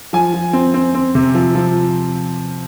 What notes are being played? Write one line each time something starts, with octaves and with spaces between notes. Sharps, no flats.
F3 G#5
F3
C4
C4
C4
C3
F3
F3